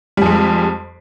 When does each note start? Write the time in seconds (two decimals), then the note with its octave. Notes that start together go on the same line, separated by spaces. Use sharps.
0.17 G3
0.22 F2
0.26 G#3